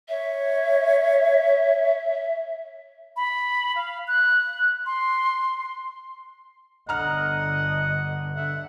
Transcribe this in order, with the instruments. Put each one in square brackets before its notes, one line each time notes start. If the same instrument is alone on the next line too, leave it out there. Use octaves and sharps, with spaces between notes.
[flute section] C#5 [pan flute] E5
[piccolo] B5
F5
F#6
C6
[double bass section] G1 D3 [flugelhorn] D#5 [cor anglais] F#5 [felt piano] A#5 F6
[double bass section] D3 [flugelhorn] E5 [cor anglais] F#5